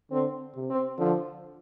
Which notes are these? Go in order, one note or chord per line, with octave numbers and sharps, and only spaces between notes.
D3 C4
C3
C4
D3 F3